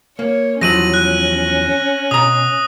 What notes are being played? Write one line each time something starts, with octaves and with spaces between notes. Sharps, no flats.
A#3 C#5
E2 F3 F#3 C#4 A#6 D#7 F#7
F#6
B2 A#5 D#6